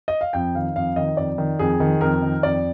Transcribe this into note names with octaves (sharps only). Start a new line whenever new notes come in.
D#5
F5
F2 G5
D#3 F5
F2 F5
D#3 D#5
F2 D5
D#3
F2 G#4
D#3
F2 A#4
D#3
F2 D5